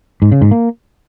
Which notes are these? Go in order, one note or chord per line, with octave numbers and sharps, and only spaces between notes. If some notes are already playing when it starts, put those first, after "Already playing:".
G#2
C#3
G#2
A#3